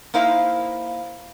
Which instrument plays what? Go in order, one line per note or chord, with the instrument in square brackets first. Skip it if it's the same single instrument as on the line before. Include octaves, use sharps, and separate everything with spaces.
[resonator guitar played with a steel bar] A#3 D#4 E4 C5 F5